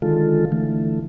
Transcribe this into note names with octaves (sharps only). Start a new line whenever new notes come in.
D3 D#3 G#3 F4 A4
D3 E3 A3